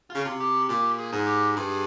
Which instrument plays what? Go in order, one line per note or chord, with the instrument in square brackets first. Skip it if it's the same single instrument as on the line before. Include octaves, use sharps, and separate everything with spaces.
[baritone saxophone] C#3 [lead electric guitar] F4
[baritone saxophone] C3
[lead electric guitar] G4
[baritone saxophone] A#2 [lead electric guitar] G4
[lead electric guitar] G#4
[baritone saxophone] G#2
[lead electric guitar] G4
[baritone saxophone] G2 [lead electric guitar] G#4